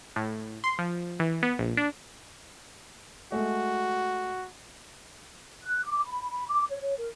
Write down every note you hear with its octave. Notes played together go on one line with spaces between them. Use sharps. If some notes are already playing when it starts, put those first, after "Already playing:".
A2
C6
F3
E3
B3
A#1
D4
G#3 A3 F#4
F#6
D6
B5
B5
D6
C#5
C#5
A#4